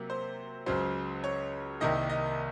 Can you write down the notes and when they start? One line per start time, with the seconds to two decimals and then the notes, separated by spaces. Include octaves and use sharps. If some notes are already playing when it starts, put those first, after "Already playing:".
Already playing: C3 F#3 A#3
0.10 C5
0.66 C#2 C#3 F#3 C5
1.24 C#5
1.80 C2 C3 D#3 A#3 D#5
2.10 D#5